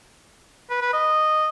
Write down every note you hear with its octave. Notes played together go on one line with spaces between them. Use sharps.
B4
B4
D#5